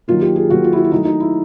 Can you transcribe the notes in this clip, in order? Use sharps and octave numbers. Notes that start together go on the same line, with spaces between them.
D#3 F#3 A#3 F4
G4
G#4
D#3 F#3 A#3 F#4
F4
E4
F4
E4
D#3 F#3 A3 D#4
D#4
E4